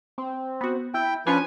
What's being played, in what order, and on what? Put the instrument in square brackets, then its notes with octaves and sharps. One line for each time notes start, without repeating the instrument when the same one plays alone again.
[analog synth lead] C4
[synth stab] B3 F#4
[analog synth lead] E4 [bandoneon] G5
[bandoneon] F3 B4 [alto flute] C#4 [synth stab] D4 F4 C#5 [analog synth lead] G#5